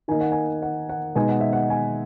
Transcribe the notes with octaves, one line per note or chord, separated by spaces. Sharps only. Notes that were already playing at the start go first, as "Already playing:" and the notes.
D#3 A#3 D#4 G#5
F#5
G#5
F#5
F#5
B2 G#3 D#4 G#5
F#5
E5
F#5
G#5